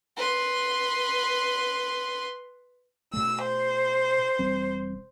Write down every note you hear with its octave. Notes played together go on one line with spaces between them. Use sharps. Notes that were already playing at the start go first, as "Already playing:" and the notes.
B4 C6
B2 A3 E6
C5
E1 G3 C4